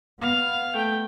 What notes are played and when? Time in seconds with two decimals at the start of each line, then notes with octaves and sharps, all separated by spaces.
0.21 B3 F5
0.74 A3 G5